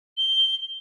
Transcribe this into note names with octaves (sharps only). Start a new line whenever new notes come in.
G7